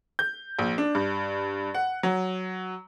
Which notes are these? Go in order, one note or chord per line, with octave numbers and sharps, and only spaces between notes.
G6
A#1
D4
G2
F#5
F#3